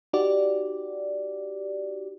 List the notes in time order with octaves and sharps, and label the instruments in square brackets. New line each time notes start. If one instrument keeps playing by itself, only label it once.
[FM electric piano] D#4 F#4 G4 D5